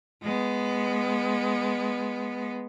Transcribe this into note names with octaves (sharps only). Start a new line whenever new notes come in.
G#3 B3